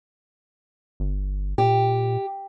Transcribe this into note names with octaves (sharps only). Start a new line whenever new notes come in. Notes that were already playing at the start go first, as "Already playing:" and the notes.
G1
A#2 G4